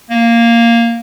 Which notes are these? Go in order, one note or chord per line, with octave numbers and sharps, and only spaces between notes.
A#3